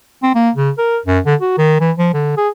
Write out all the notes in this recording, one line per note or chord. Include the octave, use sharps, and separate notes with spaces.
C4
A#3
C#3
A#4
F#2
D3
F#4
D#3
E3
F3
D3
G#4